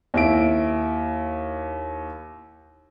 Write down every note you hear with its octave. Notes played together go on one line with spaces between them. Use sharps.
D#2 E4 D7